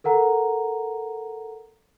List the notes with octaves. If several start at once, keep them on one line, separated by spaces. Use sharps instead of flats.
A4 A#4 F#5 A#5